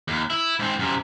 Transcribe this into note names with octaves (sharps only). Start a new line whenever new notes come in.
D#2
E4
G#2 C4
F#2 C3